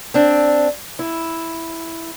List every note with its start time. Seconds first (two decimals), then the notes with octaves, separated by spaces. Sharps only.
0.14 C4 D4
0.99 E4